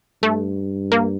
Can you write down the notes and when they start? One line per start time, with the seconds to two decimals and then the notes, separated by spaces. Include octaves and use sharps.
0.23 G2 A3
0.92 A#3